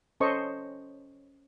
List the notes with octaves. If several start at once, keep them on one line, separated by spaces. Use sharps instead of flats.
C#4 A4 C5 D#5 C#6